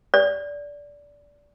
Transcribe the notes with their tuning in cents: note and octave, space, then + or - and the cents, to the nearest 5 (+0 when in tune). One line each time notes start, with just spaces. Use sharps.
D5 -15